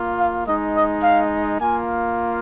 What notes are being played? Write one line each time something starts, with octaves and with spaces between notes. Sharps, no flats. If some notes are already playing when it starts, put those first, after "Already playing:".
Already playing: A#3 F4
F5
G#3 D#4 D#5
D#5
F5
A#3 F4 G#5